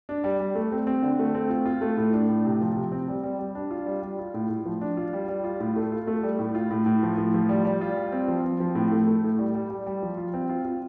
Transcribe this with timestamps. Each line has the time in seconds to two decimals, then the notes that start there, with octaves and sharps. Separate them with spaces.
0.09 D4
0.24 G3
0.40 G3
0.55 A3
0.72 C4
0.87 C4
1.02 D3
1.19 A3
1.35 C4
1.50 F4
1.65 F4
1.81 A3
1.97 A2
2.13 D4
2.29 A2
2.45 C3
2.61 F3
2.76 C3
2.92 C4
3.08 G3
3.23 G3
3.39 G3
3.55 D4
3.71 F4
3.86 G3
4.02 G3
4.19 F4
4.34 A2
4.49 A2
4.65 F3
4.81 D4
4.97 F4
5.13 G3
5.28 G3
5.44 F4
5.60 A2
5.76 A3
5.92 F4
6.07 A3
6.23 G3
6.39 A2
6.55 F4
6.71 A2
6.86 A2
7.03 F3
7.18 A2
7.34 F3
7.49 G3
7.65 G3
7.81 F4
7.96 G3
8.12 C4
8.28 F3
8.44 C4
8.60 F3
8.75 A2
8.92 A3
9.07 A3
9.24 A2
9.38 G3
9.55 G3
9.70 G3
9.86 G3
10.03 F3
10.18 F4
10.34 C4
10.49 F4
10.65 F4